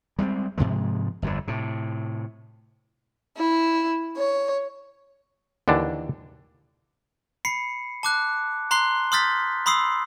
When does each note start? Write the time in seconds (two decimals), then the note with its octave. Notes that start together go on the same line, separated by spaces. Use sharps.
0.19 G3 G#3 A#3 C4
0.58 G#2 C3 F3 G#3
1.22 G1 F2 B2 D3
1.48 A2 C3
3.37 E4
4.16 C#5
5.68 D#2 D3 E3 D4
7.45 B5 C7 C#7
8.03 A5 D6 F#6
8.71 A#5 C6 F#6 C7 G7
9.12 C6 D#6 F6 G6 A6 B6
9.66 B5 C6 D#6 E6 C7